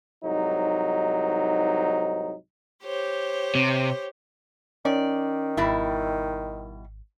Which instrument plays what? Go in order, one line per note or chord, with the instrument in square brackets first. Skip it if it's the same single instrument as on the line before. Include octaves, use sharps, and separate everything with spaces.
[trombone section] C2 G#2 F#3 D#4
[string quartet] G4 C5 C#5
[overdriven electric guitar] C3
[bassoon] D#3 [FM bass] C#4 [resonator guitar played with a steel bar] D5
[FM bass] G#1 [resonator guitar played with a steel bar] B2 G3 E4